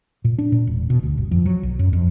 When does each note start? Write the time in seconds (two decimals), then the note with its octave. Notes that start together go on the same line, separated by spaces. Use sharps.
0.24 A#2
0.38 D4
0.52 A#2
0.67 E1
0.90 B2
1.03 D2
1.17 G1
1.31 F2
1.46 F#3
1.63 B1
1.79 F#2
1.93 F2